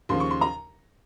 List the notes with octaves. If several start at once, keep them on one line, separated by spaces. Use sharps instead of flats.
D#2 C#3 F3 C6
C#6
C6
A#5